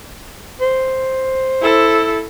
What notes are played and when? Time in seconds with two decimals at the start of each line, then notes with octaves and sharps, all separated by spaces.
0.61 C5
1.62 E4 A4